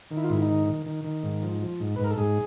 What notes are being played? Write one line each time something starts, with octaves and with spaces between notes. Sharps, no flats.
D#3
E4
F4
G#2 E4
D#4
D#3
D#3
D#3
D#3
G#2
F3
F3
G#2
B4
G#2
A#4
A4
G#2 G#4